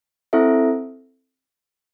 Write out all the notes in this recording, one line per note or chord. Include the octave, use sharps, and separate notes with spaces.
C4 E4 A4 E5